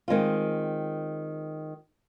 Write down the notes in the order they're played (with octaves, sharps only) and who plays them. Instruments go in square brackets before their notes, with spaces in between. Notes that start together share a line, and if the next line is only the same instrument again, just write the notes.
[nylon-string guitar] D#3 G#3 C4 F4